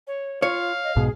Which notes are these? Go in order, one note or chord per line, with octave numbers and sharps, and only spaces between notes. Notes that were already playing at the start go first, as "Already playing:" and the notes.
C#5
F4 C#5 F5
D#5
B1 G#2 B2 G#4